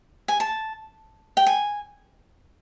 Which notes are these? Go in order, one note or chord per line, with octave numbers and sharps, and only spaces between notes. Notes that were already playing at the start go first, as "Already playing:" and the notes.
G#5
A5
G5
G#5